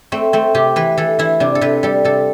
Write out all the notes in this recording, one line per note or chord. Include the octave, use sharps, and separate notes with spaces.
A3 C4
A3 C4
C3 G4
E3 B4
E3 A4
E3 E4
C3 D4
A4
C3 B4
G3 A4
C3 A4